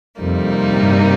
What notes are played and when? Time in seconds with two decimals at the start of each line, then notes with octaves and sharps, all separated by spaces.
0.21 F2 C3 G3 A#3 D#4
0.74 G2